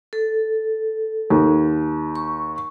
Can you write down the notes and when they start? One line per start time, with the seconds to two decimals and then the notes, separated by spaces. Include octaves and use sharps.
0.13 A4
1.30 D#2
2.16 C#6